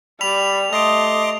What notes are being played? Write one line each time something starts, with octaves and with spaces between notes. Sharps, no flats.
G3 B5 F7
A3 D#5 C6 D6 D#6